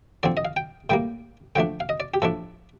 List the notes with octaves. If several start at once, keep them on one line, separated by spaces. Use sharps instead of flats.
D3 F3 C4 D5
D#5
F5
G5
A2 G3 A#3 G5
D3 F3 A3 D4 G5
F5
D#5
D5
G4
A2 F3 A3 D4 A4